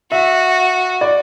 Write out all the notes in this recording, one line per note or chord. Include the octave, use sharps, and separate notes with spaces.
F#4 E5
D5